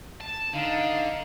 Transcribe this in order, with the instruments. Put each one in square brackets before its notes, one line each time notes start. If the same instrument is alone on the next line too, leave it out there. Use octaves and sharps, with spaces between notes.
[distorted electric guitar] A5
[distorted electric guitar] D3 [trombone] D#4 [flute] F5